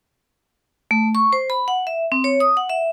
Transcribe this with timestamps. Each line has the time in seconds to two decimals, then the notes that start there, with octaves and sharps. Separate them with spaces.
0.91 A3
1.15 C#6
1.33 C5
1.50 B5
1.68 F#5
1.87 E5
2.12 C4
2.24 C#5
2.40 D#6
2.57 F#5
2.69 E5